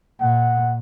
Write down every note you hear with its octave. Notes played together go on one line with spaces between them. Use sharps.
A#2 F#5